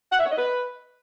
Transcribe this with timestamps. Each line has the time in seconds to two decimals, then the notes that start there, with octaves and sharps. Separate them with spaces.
0.12 F#5
0.18 E5
0.25 C#5
0.31 D#5
0.38 B4